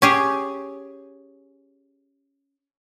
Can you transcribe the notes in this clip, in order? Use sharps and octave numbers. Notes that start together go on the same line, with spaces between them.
C#4 G4 G#4